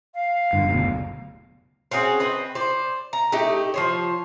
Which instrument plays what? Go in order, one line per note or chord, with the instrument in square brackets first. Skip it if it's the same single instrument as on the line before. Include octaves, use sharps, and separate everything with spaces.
[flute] F5
[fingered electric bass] G2 D3
F#1 D2 B2
[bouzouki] C4 C#4 F#4 G#4
C4 B4 D#5
C5 D5
A#5
A3 D#4 G4
F3 C5 C#5